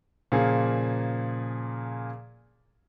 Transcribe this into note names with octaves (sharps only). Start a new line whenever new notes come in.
A#2 C#3 F3 A#3 G#4